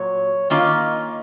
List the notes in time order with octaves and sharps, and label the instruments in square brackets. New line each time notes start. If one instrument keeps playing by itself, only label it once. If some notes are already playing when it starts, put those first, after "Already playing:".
Already playing: [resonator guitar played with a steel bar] A#2 F#3 [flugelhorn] C#5
[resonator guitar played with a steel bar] D#3 A#3 C#4 F4 [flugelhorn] D#5